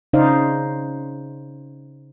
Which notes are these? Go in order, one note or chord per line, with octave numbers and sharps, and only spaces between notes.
C#3 D#4 C5 D5 F5